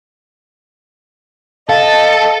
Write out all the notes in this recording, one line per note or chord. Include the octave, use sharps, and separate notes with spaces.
A4 D#5 F5 A5